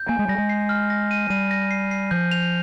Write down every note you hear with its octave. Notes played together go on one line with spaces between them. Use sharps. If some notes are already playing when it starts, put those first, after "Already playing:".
Already playing: G6
A#3 G#5
G#3
G3 A#6
G#3
C7
F6
A#6
D#7
G3 D#7
A#6
C7
C7
F3 G6
F7